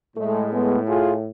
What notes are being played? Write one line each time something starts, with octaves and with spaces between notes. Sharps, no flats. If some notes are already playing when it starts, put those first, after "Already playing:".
A2 G#3 A3
G#3 B3
F4 G#4